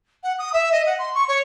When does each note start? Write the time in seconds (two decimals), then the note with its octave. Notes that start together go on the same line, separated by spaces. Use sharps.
0.23 F#5
0.39 D#6
0.53 E5
0.72 D#5
0.86 F#5
0.99 C6
1.14 C#6
1.28 C#5